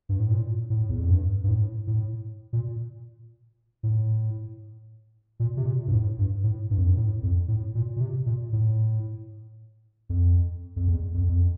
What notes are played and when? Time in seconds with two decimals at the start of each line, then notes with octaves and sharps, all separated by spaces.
0.09 G2
0.20 A2
0.30 A#2
0.70 A2
0.89 E2
0.99 F2
1.09 G2
1.44 G2
1.48 A2
1.87 A2
2.53 A#2
3.83 A2
5.40 A#2
5.57 C3
5.66 A#2
5.87 G2
5.92 A2
6.18 G2
6.43 A2
6.71 G2
6.78 F2
6.86 G2
6.97 A2
7.23 F2
7.48 A2
7.75 A#2
7.96 A#2
8.01 C3
8.26 A#2
8.53 A2
10.09 F2
10.76 F2
10.88 E2
11.14 F2
11.29 F2